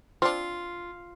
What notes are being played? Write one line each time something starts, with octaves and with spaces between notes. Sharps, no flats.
C4 D4 F4